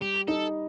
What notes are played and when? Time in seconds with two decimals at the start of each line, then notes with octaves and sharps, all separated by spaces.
0.01 G3 G4
0.28 D#4 A4